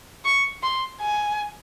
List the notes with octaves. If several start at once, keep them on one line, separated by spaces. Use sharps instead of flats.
C#6
C6
G#5